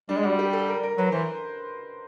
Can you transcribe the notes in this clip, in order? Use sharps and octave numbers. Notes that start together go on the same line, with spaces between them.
G3 D4
G#3
G3 F#4
G4
A4
A#4
A#4
F#3 B4
E3 C5